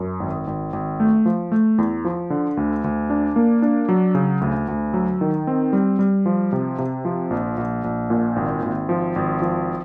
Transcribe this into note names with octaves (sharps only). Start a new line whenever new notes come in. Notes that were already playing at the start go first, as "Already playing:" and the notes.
Already playing: F#2
G#1
G#1
G#1
A3
F3
A3
E2
F3
D3
D2
D2
D4
A#3
D4
F#3
C#3
D2
D2
F#3
D#3
C4
G3
G3
F3
C3
C3
F3
A#1
A#1
A#1
A#2
G#1
G#1
F3
G#1
F3